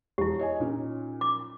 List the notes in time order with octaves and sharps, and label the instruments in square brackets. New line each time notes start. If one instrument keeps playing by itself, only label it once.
[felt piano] E1 [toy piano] E4 G4
[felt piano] C#5 D#5 G#5
A#2 C#4 D#4
[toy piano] D6